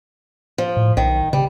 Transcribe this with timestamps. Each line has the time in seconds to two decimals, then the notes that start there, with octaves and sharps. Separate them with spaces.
0.58 F3
0.77 A2
0.97 B1 D#3
1.33 C#3 G3